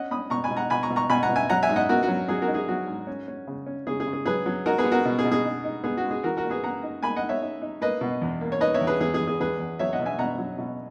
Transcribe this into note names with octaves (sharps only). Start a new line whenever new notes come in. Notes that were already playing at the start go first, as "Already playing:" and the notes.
Already playing: C#4 D#5 F#5
C#4 B5 D#6
B2 A#5 C#6
G#5 B5
B2
F#5 A#5
B2 G#5 B5
A#5 C#6
B2
A#5 C#6
B2 G#5 B5
F#5 A#5
B2
E5 G#5
F#3 F#5 A#5
E5 G#5
G#2
D#5 F#5
B3 F#4 A#4
F#4
F#3
F#3 G#4
F#4 A#4
D#4
G#4
F#3 F#4
G#2
C#4
C#4
C#3
C#4
C#3 G#4
G#4
C#3
G#4
F#3 G#4 B4
F#3
D#4 F#4 A#4
G#4 B4
B3
F#4 A#4
B2
G#4
B2
G#4
D#4
D#4
B3 G#4
F#4
G#3
G#4
E3 F#4 A#4
F#4 A#4
A#3
G#4 B4
A#3 F#5 A#5
D#4
A#3 G#5 B5
D#5 F#5
D#4
C#5 E5
D#4
D#4
A#3 B4 D#5
B2
E2
A#3
C#5
D#4 B4 D#5
C#5 E5
E2
G#4 B4
E2 G#4
G#4
E2
G#4
E2 G#4 B4
E2
F#3 C#5 E5
D#5 F#5
B2
E5 G#5
B2 F#5 A#5
F#3
B2